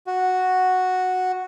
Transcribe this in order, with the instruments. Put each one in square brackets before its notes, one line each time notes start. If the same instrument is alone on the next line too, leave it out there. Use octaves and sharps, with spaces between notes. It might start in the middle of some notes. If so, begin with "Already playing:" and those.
[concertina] F#4